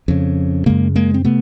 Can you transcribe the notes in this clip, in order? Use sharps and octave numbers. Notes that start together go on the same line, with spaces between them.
F2 C#3
F#2 C#3 G#3 A#3
G#3 A#3
C4
C3 A3 B3